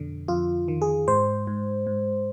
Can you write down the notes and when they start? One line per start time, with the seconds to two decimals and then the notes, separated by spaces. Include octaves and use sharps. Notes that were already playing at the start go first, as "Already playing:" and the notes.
Already playing: F2 B2 D3
0.28 F2 F4
0.68 D#3
0.82 G#4
1.08 G#2 C5
1.47 G#2
1.87 G#2